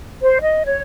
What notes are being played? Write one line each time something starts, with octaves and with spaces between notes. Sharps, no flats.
C5
D#5
C#5